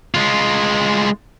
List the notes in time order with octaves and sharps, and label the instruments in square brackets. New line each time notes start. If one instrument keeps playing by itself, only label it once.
[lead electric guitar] G#3 F4